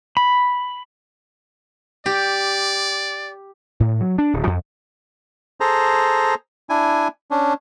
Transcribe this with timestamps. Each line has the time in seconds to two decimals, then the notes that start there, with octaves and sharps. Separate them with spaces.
0.17 B5
2.06 G4 D5
3.80 A2
4.01 F#3
4.18 D4
4.33 D1
4.47 F2
5.60 G#4 A4 C5 A#5
6.70 D4 E4 G#5
7.31 C#4 D4